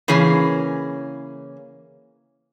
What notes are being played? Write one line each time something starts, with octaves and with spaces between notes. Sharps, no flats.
C#3 E3 A#3 C#4 G#4